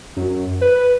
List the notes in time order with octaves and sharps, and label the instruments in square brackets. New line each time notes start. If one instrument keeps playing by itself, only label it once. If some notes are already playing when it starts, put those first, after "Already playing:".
[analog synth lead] F#2
B4